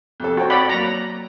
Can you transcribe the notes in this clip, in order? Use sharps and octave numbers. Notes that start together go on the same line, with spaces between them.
F2 C3 A4
C4 F#4 C#5 G5
D5 F#5 B5
F#3 A#3 A#5